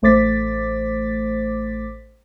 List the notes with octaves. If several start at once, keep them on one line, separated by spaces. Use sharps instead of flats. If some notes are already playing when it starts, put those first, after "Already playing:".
A1 A3 C5 D6 A6 B6